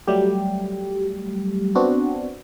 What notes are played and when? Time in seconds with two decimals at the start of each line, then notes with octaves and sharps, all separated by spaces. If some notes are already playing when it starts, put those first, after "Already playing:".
0.07 F#3 G3 A3 G4
1.75 B3 C4 D4 F#4